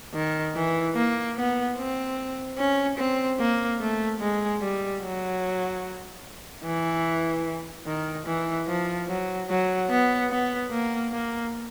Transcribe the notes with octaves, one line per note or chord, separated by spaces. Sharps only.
D#3
E3
A#3
B3
C4
C#4
C4
A#3
A3
G#3
G3
F#3
E3
D#3
E3
F3
F#3
F#3
B3
B3
A#3
A#3